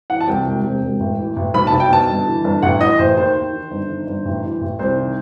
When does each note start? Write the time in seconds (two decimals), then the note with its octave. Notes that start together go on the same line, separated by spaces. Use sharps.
0.10 E3 F#5
0.21 A5
0.28 C2 G5
0.46 E1
0.64 C3
0.82 E1
1.00 A1
1.18 E3
1.36 A1
1.54 B1 B5
1.67 A5
1.72 B1
1.80 G5
1.90 B2 A5
2.09 G1
2.27 E3
2.44 G1
2.62 A1 F#5
2.81 E3 D#5
2.99 A1 C5
3.17 D#2 C5
3.35 D#2
3.53 D#3
3.71 G1
3.89 D#3
4.07 G1
4.25 A1
4.43 E3
4.61 A1
4.79 C2 C5
4.97 D#3